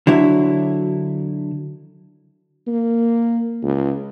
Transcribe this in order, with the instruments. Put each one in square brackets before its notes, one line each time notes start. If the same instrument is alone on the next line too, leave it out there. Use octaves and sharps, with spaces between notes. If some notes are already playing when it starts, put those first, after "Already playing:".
[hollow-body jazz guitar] D3 F#3 E4
[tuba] A#3
C#2